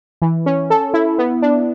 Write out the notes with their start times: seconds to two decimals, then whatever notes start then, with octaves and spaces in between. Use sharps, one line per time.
0.22 E3
0.46 C#4
0.70 A4
0.94 E4
1.19 B3
1.42 D4